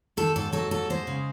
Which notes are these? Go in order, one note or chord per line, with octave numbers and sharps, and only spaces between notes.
D#3 A4
G#2 A4
F#3 A4
G#2 A4
G#3 C5
C#3